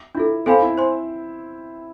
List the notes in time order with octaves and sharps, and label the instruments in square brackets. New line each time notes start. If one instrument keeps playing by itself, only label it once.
[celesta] D4 F4 A4 [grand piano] E4
[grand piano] C4 [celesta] A4 C5 F5 G#5 B5
[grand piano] E4
[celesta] C5 G#5 C6